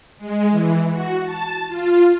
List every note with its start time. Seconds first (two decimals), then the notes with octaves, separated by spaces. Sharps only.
0.18 G#3
0.51 E3
0.92 F#4
1.23 A5
1.68 F4